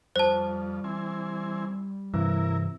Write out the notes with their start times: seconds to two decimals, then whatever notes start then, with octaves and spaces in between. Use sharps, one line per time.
0.16 F2 G3 C5 A5
0.84 E3 C4 G#5
2.14 G2 C3 E3 E4 A#4